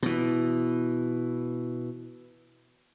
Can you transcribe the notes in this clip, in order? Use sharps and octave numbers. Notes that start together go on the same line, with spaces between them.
B2 E3